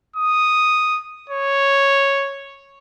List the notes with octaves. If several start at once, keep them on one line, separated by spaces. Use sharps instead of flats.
D#6
C#5